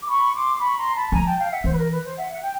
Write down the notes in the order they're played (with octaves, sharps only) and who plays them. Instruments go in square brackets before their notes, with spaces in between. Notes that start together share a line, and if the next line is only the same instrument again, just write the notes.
[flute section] D6
B5 C#6
C6 D6
D6
B5 C#6
A#5 C6
A5 B5
[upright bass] F3 [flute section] G#5 A#5
[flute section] G5 A5
F5 G5
E5 F#5
[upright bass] E3 [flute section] C5
[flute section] B4
A#4
B4
C5
E5 F#5
F#5
G5